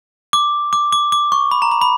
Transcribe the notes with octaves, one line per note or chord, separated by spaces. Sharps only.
D6
D6
D6
D6
C#6
B5
A#5
B5
B5